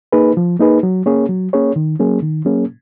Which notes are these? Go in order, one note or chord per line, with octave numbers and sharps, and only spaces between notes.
A#3 D#4 G#4 B4
F3
A#3 D#4 G#4 B4
F#3
A#3 C#4 G#4 C#5
F#3
A#3 C#4 G#4 C#5
D#3
F#3 A#3 C#4 G#4
D#3
F#3 A#3 C#4 G#4